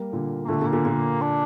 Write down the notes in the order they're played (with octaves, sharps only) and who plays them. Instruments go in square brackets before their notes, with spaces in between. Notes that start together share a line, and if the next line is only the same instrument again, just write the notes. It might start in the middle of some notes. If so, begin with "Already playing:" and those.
Already playing: [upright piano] G3 A#3
A#2 D3
[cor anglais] A#3
[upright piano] A#2 D3 [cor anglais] A3
[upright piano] A#2 D3
[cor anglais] A#3
[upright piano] A#2 D3
A#2 D3
[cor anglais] D4